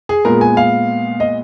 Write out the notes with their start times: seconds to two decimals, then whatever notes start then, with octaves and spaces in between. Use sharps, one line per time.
0.09 G#4
0.25 A#2 G#3 B3 A#4
0.41 G#5
0.57 F5
1.20 D#5